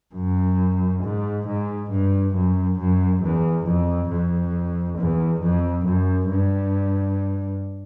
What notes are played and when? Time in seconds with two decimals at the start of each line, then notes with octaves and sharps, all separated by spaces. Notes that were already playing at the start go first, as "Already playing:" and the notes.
0.15 F#2
1.03 G#2
1.47 G#2
1.91 G2
2.35 F#2
2.79 F#2
3.23 E2
3.67 F2
4.11 F2
4.98 E2
5.43 F2
5.86 F#2
6.30 G2